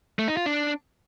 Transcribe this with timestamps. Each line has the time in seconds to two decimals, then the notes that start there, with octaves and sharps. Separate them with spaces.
0.19 A3
0.28 D#4
0.37 F4
0.46 D4